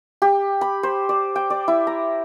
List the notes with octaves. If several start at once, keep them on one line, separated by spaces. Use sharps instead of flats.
G4
B5
C5
D5
G5
D5
E4
A#5